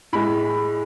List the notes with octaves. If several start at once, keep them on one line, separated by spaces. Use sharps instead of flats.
A2 G#3 B5